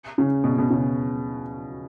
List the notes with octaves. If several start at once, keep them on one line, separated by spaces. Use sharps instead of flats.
C#3
B2
B2
C#3